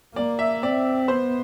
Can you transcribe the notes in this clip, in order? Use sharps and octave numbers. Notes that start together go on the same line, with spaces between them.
A#3 D5
E5
C4 D5
B3 C5